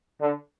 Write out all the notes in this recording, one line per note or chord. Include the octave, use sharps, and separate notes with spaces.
D3